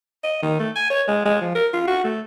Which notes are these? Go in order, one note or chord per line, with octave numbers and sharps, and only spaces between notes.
D#5
D#3
A3
G#5
C#5
G#3
G#3
F3
A#4
F4
F#4
A3